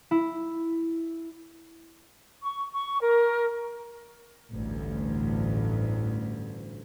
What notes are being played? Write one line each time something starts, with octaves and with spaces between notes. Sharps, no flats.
E4
C#6
C#6
A#4
A1 D2 G2